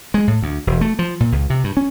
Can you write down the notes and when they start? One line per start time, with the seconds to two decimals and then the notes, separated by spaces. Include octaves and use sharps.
0.14 G#3
0.27 A2
0.42 D2
0.67 E1
0.81 A3
0.99 F3
1.20 A#2
1.32 C#2
1.50 C3
1.64 G2
1.77 C#4